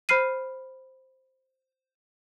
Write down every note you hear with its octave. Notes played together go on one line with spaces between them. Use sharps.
C5 B5 F6 C7 D#7